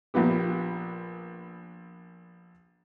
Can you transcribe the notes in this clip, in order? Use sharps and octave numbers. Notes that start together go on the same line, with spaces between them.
A#1 A#2 B3 G4